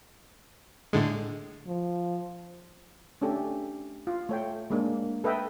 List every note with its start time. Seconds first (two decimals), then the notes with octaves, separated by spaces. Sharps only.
0.93 A2 D3 G#3
1.67 F3
3.21 A3 C#4 D4 G4 A4
4.07 F4
4.29 A3 C#5 G5
4.70 G#3 A#3 D4
5.24 A4 B4 D#5 E5 G5